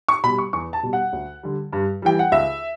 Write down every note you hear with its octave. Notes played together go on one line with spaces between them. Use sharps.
C#6
B2 G3 B5
C#6
E2 C#6
A5
B2 G3
F#5
D2
D3 G3
G2
E3 G3 G5
F#5
C#2 E5